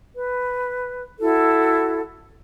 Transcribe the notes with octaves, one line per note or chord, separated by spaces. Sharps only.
B4
E4 F#4 A4